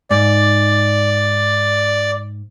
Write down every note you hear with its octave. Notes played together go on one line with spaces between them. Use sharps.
G#2 D5